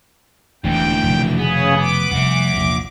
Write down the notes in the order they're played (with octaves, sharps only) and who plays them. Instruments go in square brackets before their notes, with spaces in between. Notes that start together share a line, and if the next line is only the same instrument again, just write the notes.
[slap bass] E1 C#4 D4 [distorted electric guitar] D2 E3 [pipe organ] G5
[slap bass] F1 B2 D#3
[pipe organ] C#3 G#4 [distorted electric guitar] B3
[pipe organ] D6
[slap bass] F1 C2 [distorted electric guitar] E5 F#5
[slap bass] A#1 E2 C3